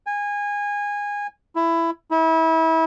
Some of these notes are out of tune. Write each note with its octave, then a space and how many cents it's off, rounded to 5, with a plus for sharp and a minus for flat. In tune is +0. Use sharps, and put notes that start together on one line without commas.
G#5 -20
E4 +15
E4 -30